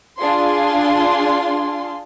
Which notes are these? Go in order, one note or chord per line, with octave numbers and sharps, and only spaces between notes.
D4 F4 G#4 C6